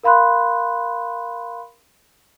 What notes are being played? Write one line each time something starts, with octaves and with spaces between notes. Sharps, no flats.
A#4 F5 B5 C6 F#6